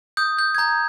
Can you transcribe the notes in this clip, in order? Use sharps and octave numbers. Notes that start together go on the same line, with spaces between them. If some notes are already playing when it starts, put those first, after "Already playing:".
D#6 G6
G6
G#6
A#5 G6